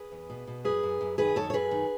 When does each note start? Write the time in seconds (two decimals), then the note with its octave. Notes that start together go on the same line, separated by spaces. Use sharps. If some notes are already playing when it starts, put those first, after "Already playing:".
Already playing: G#4 B4
0.12 E2
0.29 B2
0.47 B2
0.65 F#2 G#4 B4
0.83 F#2
1.01 F#2
1.18 D#3 G#4 B4
1.36 F#2 A4 C#5
1.50 C#5
1.54 F#2 G#4 B4
1.71 D#3